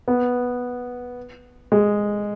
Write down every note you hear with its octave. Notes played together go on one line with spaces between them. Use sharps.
B3
G#3